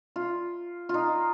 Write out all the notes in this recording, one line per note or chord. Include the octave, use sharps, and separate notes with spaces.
F4
F4
D#4